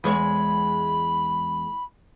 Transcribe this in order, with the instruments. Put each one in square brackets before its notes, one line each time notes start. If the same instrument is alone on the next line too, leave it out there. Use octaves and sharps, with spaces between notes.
[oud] E2 G#3 C#5 [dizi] B5